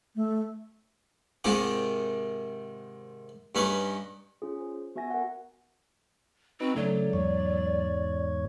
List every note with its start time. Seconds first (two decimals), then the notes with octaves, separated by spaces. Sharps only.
0.15 A3
1.44 G#2 C3 D#3 F4 D6
3.55 G2 C#4 D#4 B4
4.42 C#4 F4 G#4
4.60 C5
4.95 B3 F#4 E5 G#5 A#6
5.11 A#4 F#5
6.60 C4 D#4 F#4 B4
6.76 C#3 F#3 A3 D5
7.13 E2 G#2 C#5